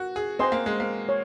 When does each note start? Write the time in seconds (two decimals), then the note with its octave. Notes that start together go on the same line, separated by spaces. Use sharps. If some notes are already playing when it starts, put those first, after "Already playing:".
Already playing: F#4 A#4
0.16 G#4
0.39 C4 C5 D#5 G#5 C6
0.52 A#3
0.66 G#3
0.80 A#3
1.09 C#5